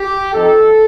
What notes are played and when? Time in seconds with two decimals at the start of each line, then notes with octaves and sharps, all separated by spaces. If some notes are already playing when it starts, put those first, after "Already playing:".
Already playing: G4
0.33 F3 C4 D#4 A4